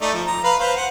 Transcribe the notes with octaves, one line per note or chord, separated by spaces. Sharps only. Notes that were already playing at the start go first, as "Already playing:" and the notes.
A3 D#4 D5
F3
A#5
B4 F5 B5
B4 C5 F5
F#5